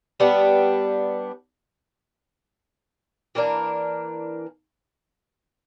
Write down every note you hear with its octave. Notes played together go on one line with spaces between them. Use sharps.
G3 B3 D4
E3 A#3 D4 A#4